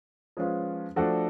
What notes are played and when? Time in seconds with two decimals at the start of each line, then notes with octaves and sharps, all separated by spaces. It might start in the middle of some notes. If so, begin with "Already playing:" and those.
0.37 F3 G#3 C#4 F4 B4
0.96 F3 A3 D4 F#4 A4